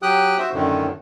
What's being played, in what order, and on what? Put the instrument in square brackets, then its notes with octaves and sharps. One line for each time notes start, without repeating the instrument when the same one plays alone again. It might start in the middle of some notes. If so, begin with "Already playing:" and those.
[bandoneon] F#3 G4 G5 D#6 F#6
F#4 C5 E5
F#2 A2 D3 D#3